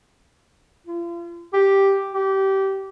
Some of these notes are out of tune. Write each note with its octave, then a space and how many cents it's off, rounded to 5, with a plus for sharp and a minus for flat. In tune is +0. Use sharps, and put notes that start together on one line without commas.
F4 -40
G4 +0
G4 -20